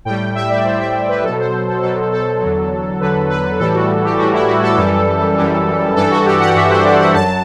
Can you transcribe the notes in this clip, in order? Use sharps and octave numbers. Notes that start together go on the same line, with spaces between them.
A2 G3 G5
E5
D5
A2 G3 C5
E5
B4
B2 F#3 A4
C5
A4
B2 F#3 A4
A4
E2 D3 F#3
E2 D3 F#3 B4
B4
A2 E3 G3 A4
F#4
G4
A2 E3 G3 F#4
E4
F#4
A4
F#2 E3 G3
F#2 E3 G3
G2 E3 G3 A4
F#4
G4
F#5
G2 E3 G3 E5
C5
D5
F#5
F#2 F#3 A5